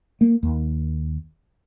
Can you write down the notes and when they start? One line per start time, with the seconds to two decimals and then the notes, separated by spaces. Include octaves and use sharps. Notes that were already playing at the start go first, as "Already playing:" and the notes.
0.21 A#3
0.43 D#2